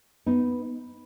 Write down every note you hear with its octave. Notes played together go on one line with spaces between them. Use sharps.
B3 D#4